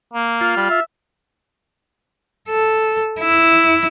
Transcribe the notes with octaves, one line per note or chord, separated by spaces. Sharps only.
A#3
F4
G3
E5
A4
E4